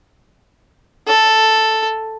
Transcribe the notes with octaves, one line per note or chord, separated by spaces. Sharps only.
A4